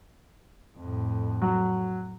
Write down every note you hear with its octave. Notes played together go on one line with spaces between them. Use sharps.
F2 A2
F#3